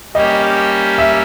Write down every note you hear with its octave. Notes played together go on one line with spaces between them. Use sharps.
G3 A#3 C#4 G4 D#5
E5